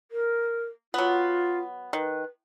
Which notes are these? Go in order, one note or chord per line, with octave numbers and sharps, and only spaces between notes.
A#4
F#3 B3 F4
D#3 B4